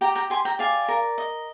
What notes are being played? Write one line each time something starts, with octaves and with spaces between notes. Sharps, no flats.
G4 G5 A#5
G5 A#5
G4 G#5 C6
G5 A#5
D5 F5 G#5
A#4
D#5